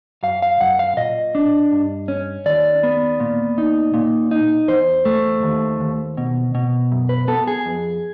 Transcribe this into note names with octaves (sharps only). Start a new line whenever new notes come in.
F#2 F5
F5
F#2 F#5
F5
A#2 D#5
D4
G2
C#4
D#2 D5
B3
A#2
D#4
A#2
D#4
E2 C5
A3
D#2
D#2
B2
B2
F#2
B4
B3 A4
G#4
F2